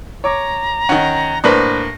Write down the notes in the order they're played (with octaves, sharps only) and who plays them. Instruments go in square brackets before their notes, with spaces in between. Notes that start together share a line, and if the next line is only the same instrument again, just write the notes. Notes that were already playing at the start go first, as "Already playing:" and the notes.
[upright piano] C#5 D6 [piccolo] A#5
[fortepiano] D#3 C#4 [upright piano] F#5
[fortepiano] A2 A#3 [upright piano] D4 B4 C5 [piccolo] A#6